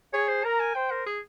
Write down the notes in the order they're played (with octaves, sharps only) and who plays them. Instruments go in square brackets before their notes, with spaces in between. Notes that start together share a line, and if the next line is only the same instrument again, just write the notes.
[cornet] G#4 [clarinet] C#5
[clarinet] C5
[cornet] A#4 [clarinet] A#5
[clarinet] G#5
[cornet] C5 [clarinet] G5
[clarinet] A#4
G#4